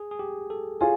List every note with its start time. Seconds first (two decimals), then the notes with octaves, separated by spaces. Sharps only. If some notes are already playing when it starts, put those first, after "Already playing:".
Already playing: G#4
0.11 G#4
0.19 G4
0.50 A4
0.81 F4 G#4 C#5